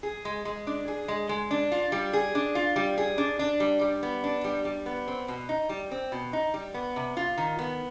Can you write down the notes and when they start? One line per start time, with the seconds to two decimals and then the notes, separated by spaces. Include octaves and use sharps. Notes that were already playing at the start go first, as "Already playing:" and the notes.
0.03 G#4
0.25 G#3
0.45 G#3
0.67 D4
0.88 G#4
1.08 G#3
1.29 G#3
1.51 D4
1.72 F4
1.92 G3
2.13 G#4
2.35 D4
2.55 F4
2.76 G3
2.98 G#4
3.18 D4
3.39 D4
3.60 G3
3.81 G3
4.03 B3
4.24 D4
4.44 G3
4.65 G3
4.86 B3
5.08 C4
5.28 B2
5.49 D#4
5.69 G3
5.91 C4
6.12 B2
6.33 D#4
6.54 G3
6.74 B3
6.96 C3
7.17 F4
7.38 D#3
7.59 B3